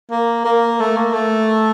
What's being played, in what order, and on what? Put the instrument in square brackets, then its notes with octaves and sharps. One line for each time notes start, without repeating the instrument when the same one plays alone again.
[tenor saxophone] A#3
A#3
A3
A#3
A3